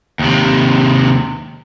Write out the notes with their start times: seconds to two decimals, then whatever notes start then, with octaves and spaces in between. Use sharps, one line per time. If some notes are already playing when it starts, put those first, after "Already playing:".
0.19 D#2 C3